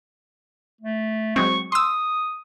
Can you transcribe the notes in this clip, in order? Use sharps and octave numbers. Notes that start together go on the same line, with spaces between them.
A3
F#3 G#3 C4 C#6
C6 D#6 E6